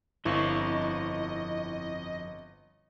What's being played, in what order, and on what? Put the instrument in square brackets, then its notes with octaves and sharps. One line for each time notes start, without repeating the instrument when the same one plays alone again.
[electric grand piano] G1 [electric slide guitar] F2 C4 F5 [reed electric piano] E4 C#6 [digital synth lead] D#5